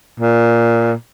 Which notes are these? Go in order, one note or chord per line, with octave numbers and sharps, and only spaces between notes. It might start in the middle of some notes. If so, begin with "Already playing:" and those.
A#2